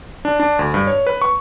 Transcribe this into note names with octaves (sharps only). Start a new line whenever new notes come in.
D4
D4
D2
G2
C#5
B4
C#6